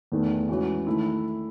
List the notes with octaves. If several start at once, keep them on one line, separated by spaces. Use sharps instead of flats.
E2 D#3 A3
E3 G#3 C#4 F#4
D#3 A3 E4